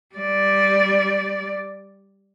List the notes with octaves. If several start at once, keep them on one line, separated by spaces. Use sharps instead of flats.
G3 D5